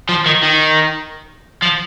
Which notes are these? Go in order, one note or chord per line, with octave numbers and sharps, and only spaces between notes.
F3
D#3
D#3
F3